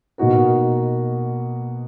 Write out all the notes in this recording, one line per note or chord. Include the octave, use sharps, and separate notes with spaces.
B2 A#3 D#4 F#4 A#4